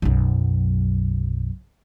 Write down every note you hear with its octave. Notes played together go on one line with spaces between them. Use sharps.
B1 F#2